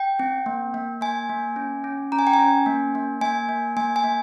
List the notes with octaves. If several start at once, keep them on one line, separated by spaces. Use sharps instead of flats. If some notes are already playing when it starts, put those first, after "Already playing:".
Already playing: G5
C4
A#3
A#3
A#3 G#5
A#3
C#4
C#4
C#4 A#5
G#5
G5
G#5
C#4
A#3
A#3
A#3 G#5
A#3
A#3 G#5
G#5
A#3